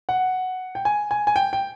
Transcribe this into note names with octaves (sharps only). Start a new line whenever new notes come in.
F#5
G5
G#5
G#5
G#5
G5
G5